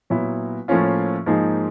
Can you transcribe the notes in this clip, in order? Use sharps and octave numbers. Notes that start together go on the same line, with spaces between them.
A#2 F#3 B3 E4
A2 F3 A#3 C#4 F4
G#2 F3 A#3 D#4 G#4